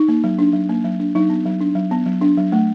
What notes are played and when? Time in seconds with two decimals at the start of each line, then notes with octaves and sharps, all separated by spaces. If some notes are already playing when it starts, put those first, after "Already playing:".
Already playing: D#4
0.08 A#3
0.24 F#3
0.39 D4
0.53 F#3
0.69 A#3
0.84 F#3
1.00 D4
1.15 F#3 D#4
1.30 B3
1.46 F#3
1.61 D4
1.75 F#3
1.91 B3
2.06 F#3
2.21 D4
2.37 F#3
2.52 A3